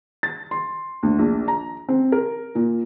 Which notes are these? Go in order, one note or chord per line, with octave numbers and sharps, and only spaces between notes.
A6
C6
D2
A#1
A#5
C4
A#4
A#2